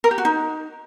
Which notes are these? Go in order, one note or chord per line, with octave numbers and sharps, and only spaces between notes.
A#4
G4
F#4
D#4